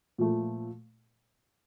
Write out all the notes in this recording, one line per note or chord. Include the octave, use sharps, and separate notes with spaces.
A#2 F3 A3